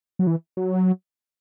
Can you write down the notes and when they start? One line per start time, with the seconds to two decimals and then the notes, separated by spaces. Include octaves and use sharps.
0.19 F#3
0.27 E3
0.57 F#3